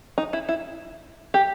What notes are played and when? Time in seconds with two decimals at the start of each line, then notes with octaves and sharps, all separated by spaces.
0.18 D#4
0.33 E4
0.49 E4
1.34 G4